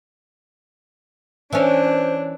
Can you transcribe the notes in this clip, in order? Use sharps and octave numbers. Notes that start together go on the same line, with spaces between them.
E3 C#4 D4 C5